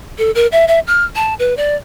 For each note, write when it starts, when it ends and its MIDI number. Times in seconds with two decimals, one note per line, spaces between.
0.18 0.31 69
0.35 0.47 70
0.52 0.65 76
0.68 0.80 76
0.87 1.04 89
1.15 1.34 81
1.39 1.54 71
1.57 1.76 74